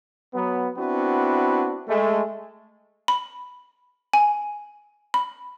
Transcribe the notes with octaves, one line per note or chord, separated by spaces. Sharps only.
F#3 B3
B3 C4 D4 E4 F#4
G#3 A3
B5
G#5
B5